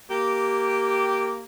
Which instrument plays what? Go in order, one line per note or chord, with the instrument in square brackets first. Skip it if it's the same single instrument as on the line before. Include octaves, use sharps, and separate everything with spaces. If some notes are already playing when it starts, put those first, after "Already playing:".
[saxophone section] A#3 G4